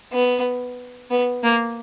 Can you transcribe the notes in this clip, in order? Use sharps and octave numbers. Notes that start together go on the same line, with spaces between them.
B3
B3
A#3